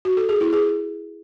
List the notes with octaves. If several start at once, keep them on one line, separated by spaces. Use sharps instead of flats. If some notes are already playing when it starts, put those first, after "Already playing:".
F#4
A4
G#4
E4
G#4